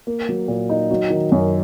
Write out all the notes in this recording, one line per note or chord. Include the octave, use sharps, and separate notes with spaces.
A#3
F#3
A#2
D#4
F#3
D#3
F#2